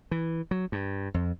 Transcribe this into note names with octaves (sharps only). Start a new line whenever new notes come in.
E3
F#3
G2
F2